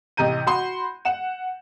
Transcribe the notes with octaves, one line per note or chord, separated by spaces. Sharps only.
A1 C3 D#5 A#5 G6 D#7
F#4 B5 C6
F#5 E7